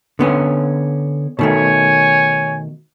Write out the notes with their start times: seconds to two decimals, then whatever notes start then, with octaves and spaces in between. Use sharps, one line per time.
0.19 D3 B3 C#4
1.39 B2 D#3 A3 C#5 G#5